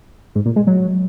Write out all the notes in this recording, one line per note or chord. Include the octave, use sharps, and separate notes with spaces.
G#2
A#2
G#3
F#3